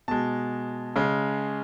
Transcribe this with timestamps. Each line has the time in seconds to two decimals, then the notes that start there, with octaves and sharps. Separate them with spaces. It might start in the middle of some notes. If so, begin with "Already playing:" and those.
0.08 B2 G#3 A5
0.96 C#3 G#3